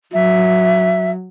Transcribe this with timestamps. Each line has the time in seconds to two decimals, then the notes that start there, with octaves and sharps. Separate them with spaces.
0.14 F#3 E5